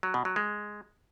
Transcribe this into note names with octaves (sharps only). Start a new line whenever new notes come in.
F#3
B2
F#3
G#3